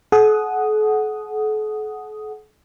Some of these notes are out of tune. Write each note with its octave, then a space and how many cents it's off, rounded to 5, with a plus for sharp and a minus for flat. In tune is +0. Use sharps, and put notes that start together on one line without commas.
A4 -45 F#5 +0 D#6 +0